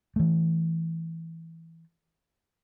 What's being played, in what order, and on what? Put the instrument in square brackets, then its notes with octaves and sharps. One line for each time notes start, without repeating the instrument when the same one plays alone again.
[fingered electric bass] E3 A3